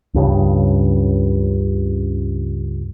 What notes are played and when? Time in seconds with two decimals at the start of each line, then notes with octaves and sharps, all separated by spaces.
0.14 C#2 G2 C#3